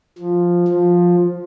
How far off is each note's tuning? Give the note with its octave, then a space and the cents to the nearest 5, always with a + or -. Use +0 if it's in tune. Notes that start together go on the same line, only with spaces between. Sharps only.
F3 +5
F3 +10